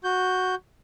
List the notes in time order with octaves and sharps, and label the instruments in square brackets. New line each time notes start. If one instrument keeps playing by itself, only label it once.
[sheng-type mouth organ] F#4 G6